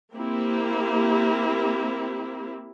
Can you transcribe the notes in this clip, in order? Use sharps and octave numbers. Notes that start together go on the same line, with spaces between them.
A#3 C4 E4 G4